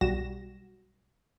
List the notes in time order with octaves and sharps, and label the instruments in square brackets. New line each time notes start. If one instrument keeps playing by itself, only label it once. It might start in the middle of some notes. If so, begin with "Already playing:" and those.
[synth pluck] B1 G3 F#4 A#6 E7